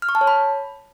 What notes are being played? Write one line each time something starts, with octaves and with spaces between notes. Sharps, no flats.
F6
C#6
A5
C#5
B5